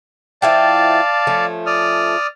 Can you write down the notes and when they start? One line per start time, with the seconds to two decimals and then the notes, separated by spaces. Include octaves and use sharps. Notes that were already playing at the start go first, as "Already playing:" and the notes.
0.42 F3 E4 D5 F5 G5 A5
1.27 F3 A3 C#4
1.66 D5 D#6 F6